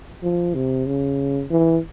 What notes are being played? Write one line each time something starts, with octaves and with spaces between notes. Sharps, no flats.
F3
C3
C#3
E3